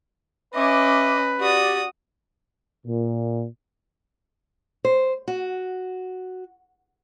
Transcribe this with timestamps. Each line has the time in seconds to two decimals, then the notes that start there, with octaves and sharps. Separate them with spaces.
0.54 C#4 B4 D#5 E5 D6
1.40 F#4 G4 D5 D#6
2.86 A#2
4.85 C5
5.28 F#4